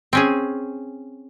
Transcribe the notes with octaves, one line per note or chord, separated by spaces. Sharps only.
C4 C#4 G#4